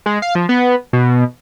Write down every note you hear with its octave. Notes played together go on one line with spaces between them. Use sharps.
G#3
F5
F3
B3
B2